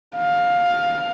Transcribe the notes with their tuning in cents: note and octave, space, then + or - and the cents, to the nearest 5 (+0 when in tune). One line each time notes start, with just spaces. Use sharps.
F5 +15